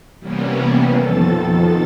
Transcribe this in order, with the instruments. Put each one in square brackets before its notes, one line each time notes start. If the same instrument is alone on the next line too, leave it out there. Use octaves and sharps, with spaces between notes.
[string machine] C3 E3 G3 A#3 B3 C#4
F2 B2 D#3 F3 A4 A6